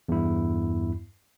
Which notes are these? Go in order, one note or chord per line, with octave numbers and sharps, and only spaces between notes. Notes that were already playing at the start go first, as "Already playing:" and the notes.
E2 G2 E4